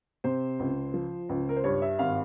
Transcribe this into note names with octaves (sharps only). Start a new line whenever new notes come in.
C3 C5
C#2
F3
C#2
A#4
C5
G2 C#5
E5
G#1 F5